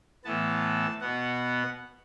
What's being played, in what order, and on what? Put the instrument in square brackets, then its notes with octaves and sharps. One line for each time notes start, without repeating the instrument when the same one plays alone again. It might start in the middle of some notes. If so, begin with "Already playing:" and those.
[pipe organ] A2 E3 B3 A5
B2 B3 F#5